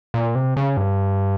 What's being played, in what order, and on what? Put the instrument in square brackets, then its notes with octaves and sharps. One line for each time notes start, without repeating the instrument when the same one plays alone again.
[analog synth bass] A#2
C3
C#3
G2